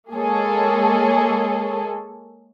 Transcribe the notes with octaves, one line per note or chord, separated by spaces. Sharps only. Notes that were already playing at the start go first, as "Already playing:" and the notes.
G#3 A#3 G#4 A4 C#5